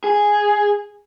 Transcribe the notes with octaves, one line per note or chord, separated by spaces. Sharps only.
G#4